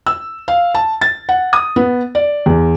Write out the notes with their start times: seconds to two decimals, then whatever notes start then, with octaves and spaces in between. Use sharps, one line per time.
0.07 E6
0.48 F5
0.75 A5
1.01 A6
1.29 F#5
1.53 D#6
1.76 B3
2.15 D5
2.46 E2